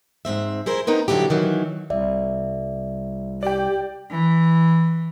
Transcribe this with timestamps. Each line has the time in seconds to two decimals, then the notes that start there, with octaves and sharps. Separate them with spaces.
0.25 G#2 B2 C4 E5
0.66 E4 G#4 A#4 C5
0.87 B3 C4 D#4 A#4 B4
1.08 F2 D3 F#3 E4 G4
1.30 D#3 E3 F#3
1.90 C2 D5 E5
3.43 G4 D5 G5
4.10 E3